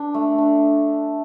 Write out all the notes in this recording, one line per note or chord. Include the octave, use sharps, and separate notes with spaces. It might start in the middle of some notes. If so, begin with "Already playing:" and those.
Already playing: D4
A3
D4